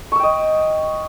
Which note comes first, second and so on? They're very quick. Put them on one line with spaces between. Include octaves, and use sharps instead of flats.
C#6 E6 G5 D#5